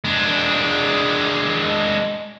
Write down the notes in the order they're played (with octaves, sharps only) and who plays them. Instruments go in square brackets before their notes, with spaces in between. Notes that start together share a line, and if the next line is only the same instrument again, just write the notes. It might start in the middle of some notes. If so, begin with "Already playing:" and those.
[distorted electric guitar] G#3 D4